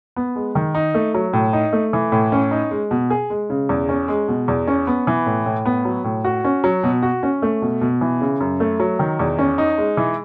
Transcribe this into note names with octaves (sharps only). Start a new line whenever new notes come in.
B3
G#3
D#3
D#4
A3
F#3
A2
D#4
A3
E3
A2
C#4
D#4
G#3
B2
G#4
G#3
C#3
E2
C#4
G#3
B2
E2
C#4
B3
E3
A2
A2
B3
F#3
A2
F#4
C#4
F#3
B2
F#4
C#4
A3
B2
B2
E3
C#3
F#2
A3
F#3
D#3
E2
C#4
D#4
G#3
E3